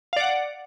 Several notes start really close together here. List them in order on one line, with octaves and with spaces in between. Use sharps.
F5 D5 F#5